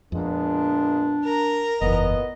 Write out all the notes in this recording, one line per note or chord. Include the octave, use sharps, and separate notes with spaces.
F2 A#2 G#3 B3 D4
A#4 A#5
F#1 E2 A#2 B3 D#5